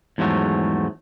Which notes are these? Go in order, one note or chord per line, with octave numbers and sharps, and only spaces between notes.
E2 G#2 F3 F#3 A3